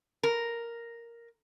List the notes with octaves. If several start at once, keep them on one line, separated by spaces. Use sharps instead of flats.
A#4